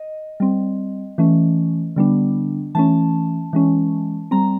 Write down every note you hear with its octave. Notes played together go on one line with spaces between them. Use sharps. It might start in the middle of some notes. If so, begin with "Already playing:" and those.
Already playing: D#5
G3 C4
E3 A3 C#4
D3 G3 B3 D4
E3 A3 C#4 A5
E3 G#3 C#4
G3 C4 A#5